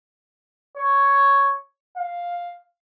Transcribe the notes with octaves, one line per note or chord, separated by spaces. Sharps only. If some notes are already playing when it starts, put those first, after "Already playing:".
C#5
F5